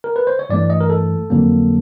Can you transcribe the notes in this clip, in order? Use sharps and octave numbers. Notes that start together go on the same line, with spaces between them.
A#4
B4
C5
C#5
G2 E3 A3 D5
D#5
A#4
A4
F2 D3 F#3 A#3